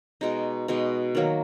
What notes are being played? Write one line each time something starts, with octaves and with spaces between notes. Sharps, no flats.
B2 G#3 D#4
B2 G#3 D#4
D#3 F#3 A#3